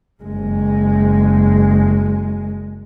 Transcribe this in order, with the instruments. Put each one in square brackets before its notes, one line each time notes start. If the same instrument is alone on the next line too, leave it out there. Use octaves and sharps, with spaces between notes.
[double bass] F#1 G#3